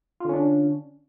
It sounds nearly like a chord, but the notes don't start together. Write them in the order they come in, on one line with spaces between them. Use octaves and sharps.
F4 D3 C#4 D4